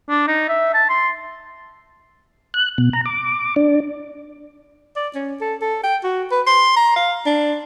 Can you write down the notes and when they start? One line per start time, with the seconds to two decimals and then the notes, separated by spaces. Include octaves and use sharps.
0.09 D4
0.27 D#4
0.48 E5
0.74 A5
0.89 C6
2.54 F#6
2.78 B2
2.93 A#5
3.06 D6
3.56 D4
4.96 D5
5.15 C#4
5.41 A4
5.61 A4
5.84 G5
6.04 F#4
6.31 B4
6.47 C6
6.76 A#5
6.96 F5
7.26 D4